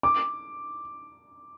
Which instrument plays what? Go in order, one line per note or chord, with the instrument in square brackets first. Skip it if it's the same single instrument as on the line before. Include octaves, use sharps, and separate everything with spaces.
[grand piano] D6